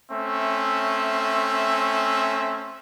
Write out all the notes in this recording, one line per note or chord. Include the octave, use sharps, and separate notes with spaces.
A3 C4 C#4 E5